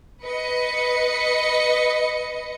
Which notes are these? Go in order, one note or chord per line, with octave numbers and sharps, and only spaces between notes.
B4 D#5 C#7